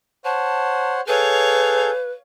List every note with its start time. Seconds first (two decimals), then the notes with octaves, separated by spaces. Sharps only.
0.25 C5 C#5 F#5 A5
1.08 G#4 A4 B4 C#5 F5 G6